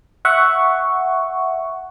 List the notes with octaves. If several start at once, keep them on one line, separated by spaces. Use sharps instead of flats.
E5 F#5 C#6